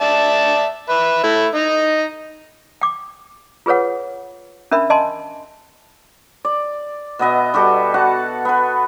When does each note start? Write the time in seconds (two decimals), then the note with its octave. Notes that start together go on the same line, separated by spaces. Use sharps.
0.01 D5 E5 A5
0.89 B4 E5
1.23 A3 E4
1.55 D#4 D#5
2.81 G5 D6
3.66 F4 G#4 B4 C#5 F#5
4.71 C#4 D4 A#4 E5 B5
4.90 D#5 G#5 A5 C6
6.45 D5
7.19 B2 B3 D#5 E5
7.54 G3 F#4 G4 A4
7.94 F#4 F#5 A5
8.45 B3 B4